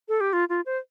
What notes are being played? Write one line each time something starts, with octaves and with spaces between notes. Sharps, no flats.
A4
G4
F4
F4
C5